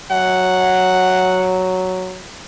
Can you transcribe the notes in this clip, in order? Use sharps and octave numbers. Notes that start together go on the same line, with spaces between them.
F#3 F#5